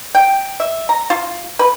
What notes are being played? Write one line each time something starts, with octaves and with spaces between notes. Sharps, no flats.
G5
E5
A#5
F4
B4